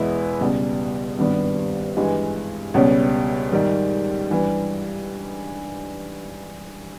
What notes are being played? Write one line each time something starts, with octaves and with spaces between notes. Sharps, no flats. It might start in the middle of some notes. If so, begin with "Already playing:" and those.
Already playing: E2 B2 G#3 B3 E4
C#2 B2 G3
G#1 G2 G3 B3
G2 E3 G#3
C#2 B2 G3 C#4
G#2 D#3 G3
G2 E3 G3